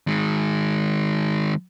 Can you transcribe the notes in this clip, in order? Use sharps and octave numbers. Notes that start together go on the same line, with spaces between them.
D#3 G#3